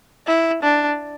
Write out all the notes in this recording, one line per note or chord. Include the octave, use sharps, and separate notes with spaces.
E4
D4